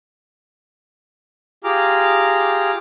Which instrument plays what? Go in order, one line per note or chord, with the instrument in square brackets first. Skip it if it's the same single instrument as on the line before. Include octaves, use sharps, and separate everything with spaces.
[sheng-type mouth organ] F4 G4 G#4 A#5 D6 F6